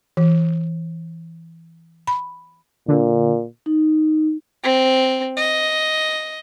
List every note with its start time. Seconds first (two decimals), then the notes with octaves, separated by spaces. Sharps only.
0.17 E3
2.07 B5
2.88 A#2 D3
3.66 D#4
4.63 C4
5.37 D#5